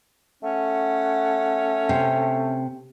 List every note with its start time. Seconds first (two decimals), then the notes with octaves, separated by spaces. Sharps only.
0.43 A3 C#4 F#5
1.89 C3